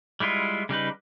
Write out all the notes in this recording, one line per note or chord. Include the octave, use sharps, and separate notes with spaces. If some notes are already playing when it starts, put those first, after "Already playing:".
G3 G#3 E4 F4
C#3 G3 D#4 B4